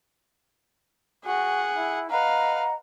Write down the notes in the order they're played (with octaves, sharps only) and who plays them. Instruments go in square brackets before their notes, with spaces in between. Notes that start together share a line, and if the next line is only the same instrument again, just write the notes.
[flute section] F#4 [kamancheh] G#4 F#5
[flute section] E4
[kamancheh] B4 F5 [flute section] D#5 F#5 A#5